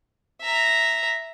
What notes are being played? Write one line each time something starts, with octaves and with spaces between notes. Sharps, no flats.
E5 A#5